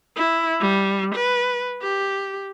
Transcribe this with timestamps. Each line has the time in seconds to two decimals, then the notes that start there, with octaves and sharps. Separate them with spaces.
0.16 E4
0.61 G3
1.15 B4
1.82 G4